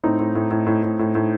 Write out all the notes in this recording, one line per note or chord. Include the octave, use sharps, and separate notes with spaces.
A2 C4 D#4
A2
A2
A2
A2
A2
A2
A2